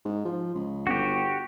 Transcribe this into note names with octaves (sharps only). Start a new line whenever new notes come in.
G#2
F3
C#2
G1 F#4 G4